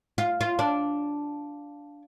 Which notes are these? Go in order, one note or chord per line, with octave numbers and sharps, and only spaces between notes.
F4
F4
D4